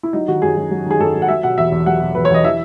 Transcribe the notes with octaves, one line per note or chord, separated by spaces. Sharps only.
E4
F#3 D#4
D#3 F#4
F#2 G#4
F#2
F#3
D#3 G#4
F#2 A4
F#2
F#5
F#3 E5
B2 F#5
E2 E5
E2
F#3 F#5
B2
E2 B4
C#5
E2 D#5
E3 E5